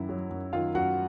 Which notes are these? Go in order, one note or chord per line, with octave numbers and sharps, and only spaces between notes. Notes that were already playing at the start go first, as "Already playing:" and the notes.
Already playing: F#2 D#3 E4
F#3
F#2
D#3 F4 F5
F#2 F#4 F#5